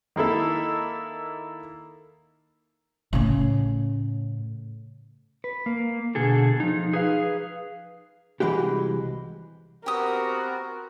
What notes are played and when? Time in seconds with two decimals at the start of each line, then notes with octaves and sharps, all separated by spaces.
0.16 D#3 A#3 E4 A4
3.13 A2 C#3
5.44 B4
5.66 A#3
6.15 B2 D3 G#4 A4
6.60 F3 D#4
6.93 G#4 B4 F5
8.40 C2 G#2 E3 G#3 F#4 G4
9.86 B3 C4 F#4 G4 A#4 D#6